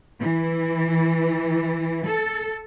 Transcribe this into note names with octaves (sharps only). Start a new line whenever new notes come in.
E3
A4